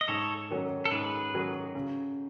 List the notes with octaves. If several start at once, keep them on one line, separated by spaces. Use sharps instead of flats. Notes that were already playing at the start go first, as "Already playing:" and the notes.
D#5
G#2 A4 C#5
D#3 F#3 C#4
A4
G#2 G#4 B4
D#3 F#3 C#4
C#3